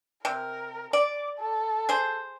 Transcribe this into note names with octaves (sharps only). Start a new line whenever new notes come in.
C3 A#4
D5 D6
A4
G#4 C5